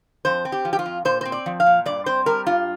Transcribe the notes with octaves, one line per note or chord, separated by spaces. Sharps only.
F2 C5
C4
G4
F3
G4
F4
F2
A#2 C5
C4 C5
D5
F3
F5
A#2
G2 D5
C4 C5
G3 A#4
G2 F4